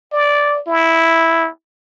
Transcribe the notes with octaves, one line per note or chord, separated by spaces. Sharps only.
D5
E4